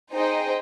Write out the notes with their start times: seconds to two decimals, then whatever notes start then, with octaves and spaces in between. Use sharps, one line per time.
0.13 D#4 G#4 C5 D#5 G5